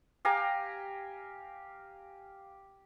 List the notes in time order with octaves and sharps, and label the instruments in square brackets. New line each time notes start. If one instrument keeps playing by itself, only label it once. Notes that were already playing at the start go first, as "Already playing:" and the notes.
[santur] G4 F5 G#5 A#5